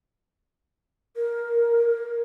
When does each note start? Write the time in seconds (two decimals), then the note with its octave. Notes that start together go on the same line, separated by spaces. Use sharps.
1.16 A#4